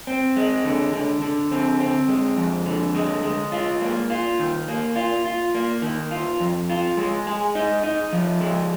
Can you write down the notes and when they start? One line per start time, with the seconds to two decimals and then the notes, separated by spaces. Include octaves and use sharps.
0.07 C4
0.36 G#3
0.64 D3
0.94 D3
1.22 D3
1.51 C4
1.80 C4
2.08 G#3
2.37 F2
2.66 D3
2.95 G#3
3.23 G#3
3.52 F4
3.82 A#3
4.10 F4
4.39 D#3
4.68 A#3
4.96 F4
5.25 F4
5.54 A#3
5.82 D#3
6.11 F4
6.40 F2
6.70 F4
6.97 G#3
7.27 G#4
7.55 D#4
7.84 D#4
8.13 F3
8.41 G#3